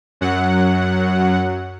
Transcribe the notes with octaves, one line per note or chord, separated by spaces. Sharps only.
F#2 F#3 F#5